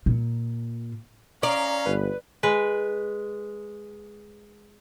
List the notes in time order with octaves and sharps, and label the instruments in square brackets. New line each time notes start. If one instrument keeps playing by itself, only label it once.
[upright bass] A#2
[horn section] C#4 F5 [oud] D5 [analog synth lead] A#5
[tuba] G1 [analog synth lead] B4
[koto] G#3 B4